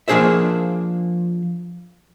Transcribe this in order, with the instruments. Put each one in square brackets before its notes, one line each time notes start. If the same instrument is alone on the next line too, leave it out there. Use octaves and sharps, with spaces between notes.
[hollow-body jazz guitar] F3 A#3 D4 G#4 C5 E5